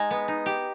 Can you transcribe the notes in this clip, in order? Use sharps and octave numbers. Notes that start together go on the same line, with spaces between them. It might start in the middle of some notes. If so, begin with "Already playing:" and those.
Already playing: G#3 D#4
B3
D#4
G4